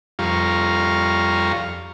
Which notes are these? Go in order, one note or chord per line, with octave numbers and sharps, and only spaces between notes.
F2 G3 F4 F5 A#5 C#6